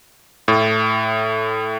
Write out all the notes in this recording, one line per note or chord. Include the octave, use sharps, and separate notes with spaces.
A2